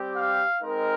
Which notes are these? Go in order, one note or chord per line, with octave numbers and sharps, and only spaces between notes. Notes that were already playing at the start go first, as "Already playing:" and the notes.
Already playing: G3 C4 G4
F5
G#3 C4 D#4 A#4